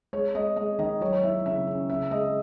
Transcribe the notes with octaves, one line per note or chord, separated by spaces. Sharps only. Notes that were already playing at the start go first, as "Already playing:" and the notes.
G#3 C#5
G#3 D#5
G#3 D#5
D#3 D#5
F#3 C#5
C#5
E4 E5
C#3 E5
C#4
C#3 E5
G#3 D#5